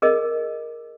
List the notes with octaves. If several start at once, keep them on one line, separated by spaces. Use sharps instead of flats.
G#4 A#4 D#5